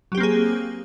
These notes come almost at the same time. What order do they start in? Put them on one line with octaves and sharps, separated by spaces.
F#3 G4 C4 A#3 G#4